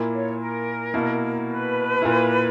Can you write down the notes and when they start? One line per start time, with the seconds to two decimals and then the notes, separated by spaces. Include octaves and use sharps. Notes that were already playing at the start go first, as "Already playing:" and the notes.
Already playing: A#2 A#3 E4
0.13 C#5
0.39 A#4
0.94 B2 A#3 E4
1.48 B4
2.02 A#2 A#3 E4